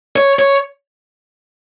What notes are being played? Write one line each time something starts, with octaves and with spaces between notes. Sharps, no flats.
C#5
C#5